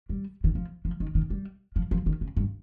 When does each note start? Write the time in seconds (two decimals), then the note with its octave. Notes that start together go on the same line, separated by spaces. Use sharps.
0.09 G3
0.44 D#3
0.55 F3
0.85 F3
1.00 D#3
1.15 D#3
1.30 G3
1.76 F3
1.91 F3
2.06 D#3
2.21 C#3
2.37 G2